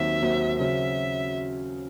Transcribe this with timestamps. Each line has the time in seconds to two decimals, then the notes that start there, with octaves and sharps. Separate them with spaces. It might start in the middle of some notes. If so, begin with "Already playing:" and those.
Already playing: D#2 D#3 F#3 C4 F#4 E5
0.21 D#2 D#3 F#3 C4 F#4
0.59 C#3 F#3 C4 F#4 E5